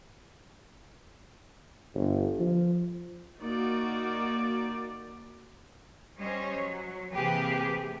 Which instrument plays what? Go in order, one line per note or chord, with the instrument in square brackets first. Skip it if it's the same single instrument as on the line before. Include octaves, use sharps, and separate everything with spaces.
[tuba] G1
F3
[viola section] A#3 D#4 F#4 D5
[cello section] G3 C#4 C5 C#5 D#5
F#3
C3 E3 A#3 G4 G#4 B4
A3